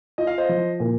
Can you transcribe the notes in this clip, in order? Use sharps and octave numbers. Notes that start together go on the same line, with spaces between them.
F4 D#5
F5
C5 D#5
F3
A#2